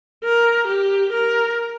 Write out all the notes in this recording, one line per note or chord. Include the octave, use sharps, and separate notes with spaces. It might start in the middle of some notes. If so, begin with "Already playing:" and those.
A#4
G4
A#4